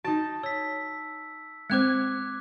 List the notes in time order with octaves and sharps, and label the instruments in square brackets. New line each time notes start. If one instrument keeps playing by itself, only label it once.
[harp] D#4 A5 [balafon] F#4
[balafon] C#5 [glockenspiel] E6 B6
[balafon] G#3 C4 C5 [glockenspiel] D6 F#6 G#6